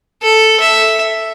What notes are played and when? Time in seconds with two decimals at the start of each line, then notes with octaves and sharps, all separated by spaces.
0.22 A4
0.60 E5